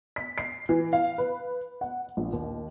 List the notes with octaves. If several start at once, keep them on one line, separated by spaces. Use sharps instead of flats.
B6
C7
E3
F5
B4
F#5
A#1
D#2